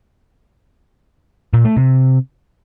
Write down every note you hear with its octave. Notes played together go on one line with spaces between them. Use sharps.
A#2
A3
C3